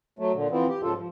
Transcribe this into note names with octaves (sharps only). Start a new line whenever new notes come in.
F#3 A3
A#2 D3
E3 F3 B3 C4
G4
G#2 C#3 F3 F4 A4
F3